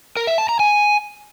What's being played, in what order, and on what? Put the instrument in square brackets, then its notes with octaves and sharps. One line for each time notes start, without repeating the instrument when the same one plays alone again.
[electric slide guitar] A#4
E5
A5
A#5
G#5